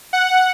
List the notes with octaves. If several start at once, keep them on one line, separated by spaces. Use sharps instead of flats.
F#5